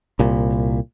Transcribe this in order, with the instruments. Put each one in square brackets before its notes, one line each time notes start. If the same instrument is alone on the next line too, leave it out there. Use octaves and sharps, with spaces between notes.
[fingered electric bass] C2 A#2